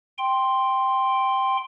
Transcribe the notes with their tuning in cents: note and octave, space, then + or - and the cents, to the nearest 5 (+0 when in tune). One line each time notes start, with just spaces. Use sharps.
G5 +0 C6 +0